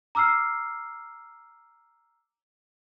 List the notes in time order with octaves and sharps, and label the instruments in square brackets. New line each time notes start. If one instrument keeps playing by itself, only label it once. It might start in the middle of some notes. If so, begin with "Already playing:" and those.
[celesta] A#5 D6 E6 F6 C7